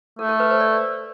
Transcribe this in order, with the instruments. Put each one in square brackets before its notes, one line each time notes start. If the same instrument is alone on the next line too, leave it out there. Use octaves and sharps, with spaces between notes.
[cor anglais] A3 [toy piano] A4
[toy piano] A4
B4
C5
D5